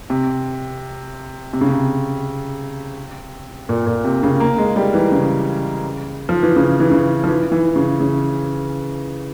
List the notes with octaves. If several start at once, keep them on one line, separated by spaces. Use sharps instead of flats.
C3
C3
C#3
C3
A#2
A#2
C3
C#3
A#3
G#3
G3
E3
C#3
F3
E3
C#3
E3
C#3
F3
E3
E3
C#3
C#3